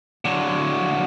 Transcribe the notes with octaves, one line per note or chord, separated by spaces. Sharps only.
D3 F#3